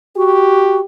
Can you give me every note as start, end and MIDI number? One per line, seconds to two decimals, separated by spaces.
0.16 0.80 66
0.16 0.85 67